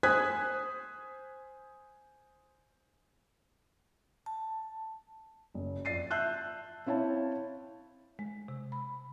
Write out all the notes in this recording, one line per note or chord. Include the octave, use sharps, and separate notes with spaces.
C5 G#5 D#6 F#6 G#6 B6
A5
F#1
F2 D5 A6 C7 D#7
E5 A5 E6 F#6 G6
C4 E4 C#5 F5 A5
G#3
C3
B5